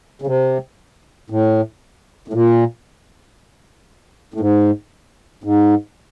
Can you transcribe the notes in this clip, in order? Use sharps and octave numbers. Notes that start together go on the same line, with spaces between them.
C#3
C3
A2
A2
A#2
A2
G#2
G#2